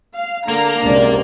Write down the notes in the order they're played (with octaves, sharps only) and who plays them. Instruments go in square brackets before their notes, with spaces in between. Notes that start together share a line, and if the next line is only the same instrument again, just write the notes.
[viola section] F5
[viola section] D3 A#5 [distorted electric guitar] A#3
[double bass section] C#2 C3 [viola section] D4 D5